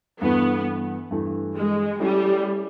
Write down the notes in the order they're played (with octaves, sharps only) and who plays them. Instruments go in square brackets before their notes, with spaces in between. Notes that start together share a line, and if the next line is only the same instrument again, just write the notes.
[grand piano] G2 E3 A3 [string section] B3
[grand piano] G2 E3 A3
[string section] G#3
[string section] G3 [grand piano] A3 C#4 E4